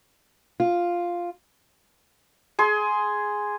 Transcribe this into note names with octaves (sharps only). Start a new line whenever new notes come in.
F4
G#4 C6